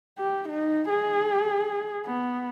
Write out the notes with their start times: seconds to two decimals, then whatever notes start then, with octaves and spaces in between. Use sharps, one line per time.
0.19 G4
0.48 D#4
0.89 G#4
2.06 B3